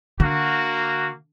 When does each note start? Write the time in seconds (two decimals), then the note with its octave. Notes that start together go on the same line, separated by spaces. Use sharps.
0.20 D3 A#3 F#4